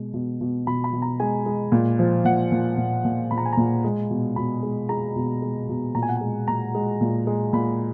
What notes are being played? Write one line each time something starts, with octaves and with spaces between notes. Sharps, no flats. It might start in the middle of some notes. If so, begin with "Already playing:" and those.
Already playing: B2 G#3
B2
B2
B2 B5
B5
B2
A#5
G#3 G#5
G#3
A#2
F3
A#2 F#5
A#2
A#2
A#2
A#2 B5
A#5
G#5
A#2 A#5
G#3
B2
B2 B5
G#3
G#3 A#5
B2
G#3
B2
A#2 A#5
G#5
F#5
G#3 G#5
A#2 A#5
G#3
A#2
G#3
A#2 B5